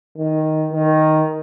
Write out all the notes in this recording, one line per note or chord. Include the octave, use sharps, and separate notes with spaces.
D#3
D#3